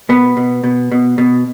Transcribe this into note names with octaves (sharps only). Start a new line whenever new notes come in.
B2 B3
B2
B2
B2
B2